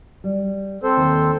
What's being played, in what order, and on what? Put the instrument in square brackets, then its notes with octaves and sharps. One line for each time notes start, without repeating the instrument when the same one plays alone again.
[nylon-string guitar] G3
[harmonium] C4 A4 C5
[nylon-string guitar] D#2 D#3